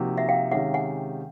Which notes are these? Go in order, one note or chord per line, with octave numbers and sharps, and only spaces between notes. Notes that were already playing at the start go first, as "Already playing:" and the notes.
Already playing: C3 F3 A#3 D#4 F#4
E5 F#5
F5 G5
C3 D#3 G#3 C#4 E5 F#5
F#5 G#5